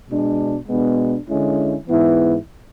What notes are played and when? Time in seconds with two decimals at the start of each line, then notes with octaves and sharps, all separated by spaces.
0.09 B2 G#3 D4
0.68 B2 G#3 B3 D4
1.28 D3 G#3 C#4 E4
1.88 G#2 E3 B3 E4